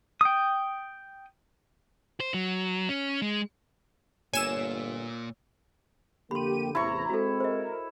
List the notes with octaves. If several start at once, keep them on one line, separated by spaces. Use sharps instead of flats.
G5 D#6
C5
F#3
C#4
G#3
G1 A#2 A#3 C#5 G#5 E6 E7
F2 D3 A#3 G4 B5 C6 D#7
A1 E2 C3 E4 A#5 C#6
G#3 C4 F#4 A4
A#4 C5 D#5